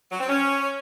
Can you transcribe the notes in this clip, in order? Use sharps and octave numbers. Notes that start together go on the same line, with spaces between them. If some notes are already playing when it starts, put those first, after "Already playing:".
F#3
C4
C#4